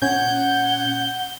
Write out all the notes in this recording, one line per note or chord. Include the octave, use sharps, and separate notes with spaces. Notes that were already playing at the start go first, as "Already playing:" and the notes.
A#2 C#4 F#5 G6 G#6